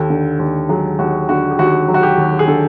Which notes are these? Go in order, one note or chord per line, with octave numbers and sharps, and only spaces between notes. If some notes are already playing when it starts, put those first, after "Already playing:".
Already playing: D#2 A4
D3
D#2
F#3 G#4
D#2 F#4
D3 F#4
G4
D#2 F#4
F#3
F#4
G4
D#2
G#4
D3 A4